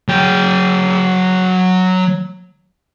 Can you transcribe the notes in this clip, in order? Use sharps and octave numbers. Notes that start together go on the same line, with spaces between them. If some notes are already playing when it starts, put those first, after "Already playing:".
F#3 G5